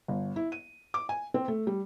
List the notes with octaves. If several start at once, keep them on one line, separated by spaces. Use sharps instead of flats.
G1
E4
D#7
D6
G#5
C4
A3
G3